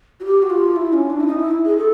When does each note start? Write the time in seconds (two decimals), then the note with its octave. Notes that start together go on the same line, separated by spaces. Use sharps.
0.20 F#4
0.25 G4
0.42 F#4
0.50 F4
0.76 E4
0.93 C#4
1.10 D4
1.20 E4
1.27 D#4
1.40 E4
1.65 G#4
1.78 A4